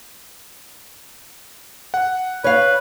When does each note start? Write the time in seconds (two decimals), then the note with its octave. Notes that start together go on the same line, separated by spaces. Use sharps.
1.94 F#5
2.44 B4 C#5 F5